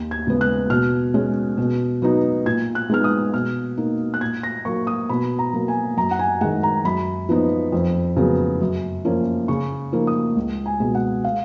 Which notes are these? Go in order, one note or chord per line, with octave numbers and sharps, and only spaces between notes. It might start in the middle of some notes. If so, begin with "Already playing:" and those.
Already playing: D#2
G#6
C#3 G#3 B3
F#6
B2 F6
G#3 C#4
B2
F#3 B3 D#4
A#2 G#6
F#6
G#3 B3 D#4 F6
D#6
B2 F6
A#3 D#4
F#6
A#2 G#6
A#6
F#3 A#3 C#6
D#6
B2 B5
A#5
F#3 A#3
G#5
F#2 A#5
F#5
G#5
D#3 G#3 F#5
A#5
F#2 B5
F3 B3 D#4
F2
C#3 F#3 B3
F#2
F3 A#3 C#4
C#3 C#6
F3 A#3 D#4
D#6
C#2
G#5
B2 G#3
F#5
F5